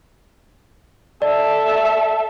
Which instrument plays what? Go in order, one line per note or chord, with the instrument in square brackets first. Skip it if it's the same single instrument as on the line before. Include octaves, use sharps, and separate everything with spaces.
[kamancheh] A4 E5 [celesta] D5